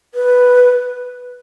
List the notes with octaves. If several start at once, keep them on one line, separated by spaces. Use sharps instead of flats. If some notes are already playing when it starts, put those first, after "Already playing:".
B4